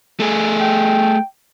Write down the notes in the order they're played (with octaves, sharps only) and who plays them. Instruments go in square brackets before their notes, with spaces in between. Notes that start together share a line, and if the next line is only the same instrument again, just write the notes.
[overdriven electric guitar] A3 G#4
[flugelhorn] G5